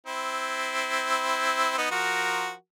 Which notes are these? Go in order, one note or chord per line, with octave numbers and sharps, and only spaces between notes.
C4 E4
B3 D#4
F3 F#4 A#4